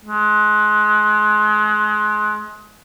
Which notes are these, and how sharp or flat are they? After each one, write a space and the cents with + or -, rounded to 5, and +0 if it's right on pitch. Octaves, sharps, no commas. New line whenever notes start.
G#3 +30